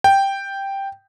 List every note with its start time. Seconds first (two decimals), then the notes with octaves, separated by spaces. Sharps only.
0.04 G5